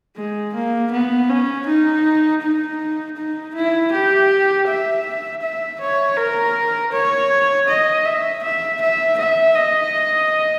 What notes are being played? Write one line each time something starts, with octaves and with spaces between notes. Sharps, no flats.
G#3
A#3
B3
C#4
D#4
D#4
D#4
E4
G4
E5
E5
C#5
A#4
C#5
D#5
E5
E5
E5
E5
D#5